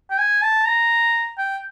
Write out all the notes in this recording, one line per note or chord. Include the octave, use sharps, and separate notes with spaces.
G5
G#5
A5
A#5
G5